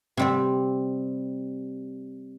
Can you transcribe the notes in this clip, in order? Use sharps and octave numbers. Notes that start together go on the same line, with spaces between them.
C3 G3 C4